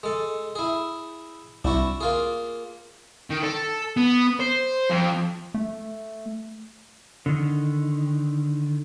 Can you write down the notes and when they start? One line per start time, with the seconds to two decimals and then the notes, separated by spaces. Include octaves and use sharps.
0.03 G#3 A4
0.55 E4 G#4
1.64 C2 D4 E4 F#4
2.01 A#3 F4 G#4
3.30 D#3
3.43 A4
3.97 B3
4.40 C5
4.90 F2
5.54 A3
7.26 D3 D#3